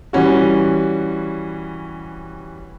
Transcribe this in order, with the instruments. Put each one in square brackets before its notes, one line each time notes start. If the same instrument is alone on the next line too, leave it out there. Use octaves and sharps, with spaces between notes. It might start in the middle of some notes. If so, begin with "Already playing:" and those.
[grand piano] E3 G3 C#4 F#4